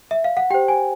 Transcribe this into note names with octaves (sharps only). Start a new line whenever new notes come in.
E5
F5
F#5
G4 C5 G5
G#5